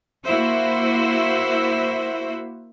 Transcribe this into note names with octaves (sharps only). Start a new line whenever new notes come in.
A#3 E4 F#4 C5 E5